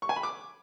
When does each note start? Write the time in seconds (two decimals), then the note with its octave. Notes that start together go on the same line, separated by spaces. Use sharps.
0.02 C#6
0.09 G#5
0.16 B5
0.23 D6